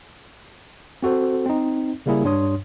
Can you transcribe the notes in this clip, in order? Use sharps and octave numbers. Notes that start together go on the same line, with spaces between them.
C4 F#4 A4 C5
C4 D#4
C#3 G3 A#3 E4 G#4
G2 D4 C#5 C6 D#6